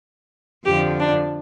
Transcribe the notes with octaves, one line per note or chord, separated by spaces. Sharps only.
F2 D3 F3 G4
D4